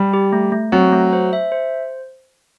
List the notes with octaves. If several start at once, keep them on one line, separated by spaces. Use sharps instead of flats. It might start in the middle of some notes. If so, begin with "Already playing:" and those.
Already playing: G3
G4
A3
A3
F#3 C4
A3
C5
E5
C5